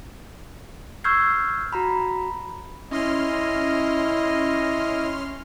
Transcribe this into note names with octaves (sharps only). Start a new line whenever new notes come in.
C#6 E6 F6 G6 G#6 C7
F#4 A#5 B5
C#4 E4 D#5 C6 F6